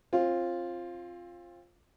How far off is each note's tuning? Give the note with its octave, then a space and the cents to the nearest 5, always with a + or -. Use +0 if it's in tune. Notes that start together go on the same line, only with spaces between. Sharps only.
C4 +30 F4 +0